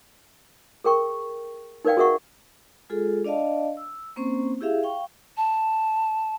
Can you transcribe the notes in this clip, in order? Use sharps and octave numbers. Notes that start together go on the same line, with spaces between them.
G#4 A#4 G5 C#6
D#4 A#4 B4 D5 F5 G5
F#4 G#4 A#4 E5 F#5 C#6
G#3 F4 G#4 A4
D4 D5 D#5 F5 A5
E6
A#3 C4 C#4 C5 C#6
E4 G4 G#4 E5 F5
F5 G5 C#6
A5